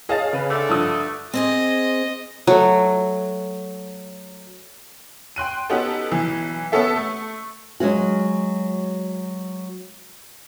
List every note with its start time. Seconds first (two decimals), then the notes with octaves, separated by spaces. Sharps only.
0.09 G#4 C#5 D#5 F5 A5 A6
0.33 C#3 B4
0.49 D3 A3
0.69 G2 F3 A5 D#6
1.34 C4 G#4 C5 D#5
2.47 F#3 A3
5.36 G5 C6 F#6 D#7
5.70 B3 C#4 D#4 F#4 G4 A4
6.11 B1 E3
6.72 B3 C#4 A4 E5
6.96 A3
7.80 F#3 G#3 C#4 F#4